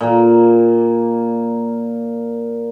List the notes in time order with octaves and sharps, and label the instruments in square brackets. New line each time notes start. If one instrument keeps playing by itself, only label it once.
[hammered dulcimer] A#2 A#3